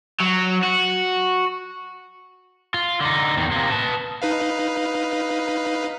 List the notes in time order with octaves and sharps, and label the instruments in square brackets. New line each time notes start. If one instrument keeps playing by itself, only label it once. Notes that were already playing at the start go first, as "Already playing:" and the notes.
[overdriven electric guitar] F#3
F#4
F4
D3 D#4
E2 D#3
C3 A#3
B4 A5
[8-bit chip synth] D#4 B4 F5